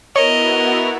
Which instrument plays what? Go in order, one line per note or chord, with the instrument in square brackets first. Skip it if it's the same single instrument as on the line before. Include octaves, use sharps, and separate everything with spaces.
[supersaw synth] B3 E4 F#4 [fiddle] A#4 [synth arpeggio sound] C#5 [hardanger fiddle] D#5